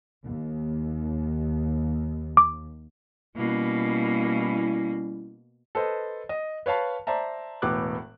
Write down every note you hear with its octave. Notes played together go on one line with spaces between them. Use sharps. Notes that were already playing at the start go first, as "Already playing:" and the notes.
D#2
D6
B2 G3 A#3 C#4 E4
A4 B4 C5 D#5
D#5
B4 C#5 F5 A5 B5
C5 D5 E5 A5 A#5
E1 A2 B3 D6 F#6